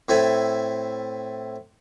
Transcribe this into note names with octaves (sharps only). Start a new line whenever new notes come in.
A2 C4 E4 A4 G#5